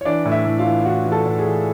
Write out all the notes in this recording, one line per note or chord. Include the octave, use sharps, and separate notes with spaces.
C#5
E3 D4 D5
A2
E4 E5
A2
F4 F5
E3
E3 F#4 F#5
E3
A4 A5
A2
G#4 G#5
E3